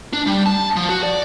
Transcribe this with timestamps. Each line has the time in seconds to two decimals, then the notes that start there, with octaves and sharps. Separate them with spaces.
0.13 D4
0.27 G3
0.46 A5
0.76 F3
0.89 F#4
1.03 D5